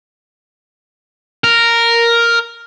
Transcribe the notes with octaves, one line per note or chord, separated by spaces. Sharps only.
A#4